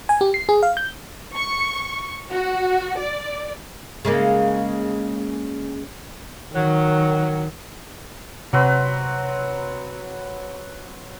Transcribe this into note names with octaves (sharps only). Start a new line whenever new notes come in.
G#5
G4
C7
G#4
F5
G6
C#6
F#4
D5
C#3 G#3 A#3
D#3 F#3
C3 F#3 C4 B4